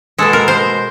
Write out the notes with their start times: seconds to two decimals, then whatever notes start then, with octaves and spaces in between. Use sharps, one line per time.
0.18 B2 G#3 A4
0.33 A#4
0.48 C5